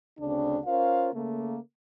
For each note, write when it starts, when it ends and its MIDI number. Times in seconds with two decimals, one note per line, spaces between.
0.20 0.59 38
0.20 0.59 49
0.20 0.59 60
0.20 0.59 62
0.66 1.10 61
0.66 1.10 65
0.66 1.10 70
0.66 1.10 72
0.66 1.10 77
1.14 1.59 49
1.14 1.59 57
1.14 1.59 58